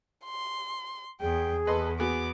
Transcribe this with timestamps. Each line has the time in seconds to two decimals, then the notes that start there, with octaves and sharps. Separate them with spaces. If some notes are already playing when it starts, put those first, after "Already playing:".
0.24 C6
1.21 E2 G#4 G5
1.67 E2 A4 B4 D#5 C6
2.00 B3 F#4 G#4 D6